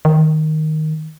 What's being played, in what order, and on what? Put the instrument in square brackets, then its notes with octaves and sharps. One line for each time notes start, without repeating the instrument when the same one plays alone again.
[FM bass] D#3